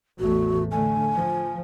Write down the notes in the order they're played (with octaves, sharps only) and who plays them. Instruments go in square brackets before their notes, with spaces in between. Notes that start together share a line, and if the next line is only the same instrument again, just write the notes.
[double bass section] A1 E2 A3 [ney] F#4
[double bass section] D3 A3 [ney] G#5
[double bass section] F3